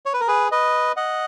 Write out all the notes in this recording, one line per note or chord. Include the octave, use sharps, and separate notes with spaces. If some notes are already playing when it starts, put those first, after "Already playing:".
C#5
B4
A#4
G#4 B4
B4 D#5
D#5 F#5